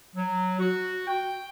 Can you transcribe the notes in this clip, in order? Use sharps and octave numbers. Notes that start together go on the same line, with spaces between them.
F#3
F#4
G5